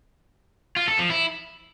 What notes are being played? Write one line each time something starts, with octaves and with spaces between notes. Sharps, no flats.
F4
A4
F3
E4